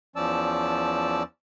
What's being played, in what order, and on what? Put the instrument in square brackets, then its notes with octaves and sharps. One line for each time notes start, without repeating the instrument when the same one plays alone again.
[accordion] E2 F3 C#4 D5 A5 E6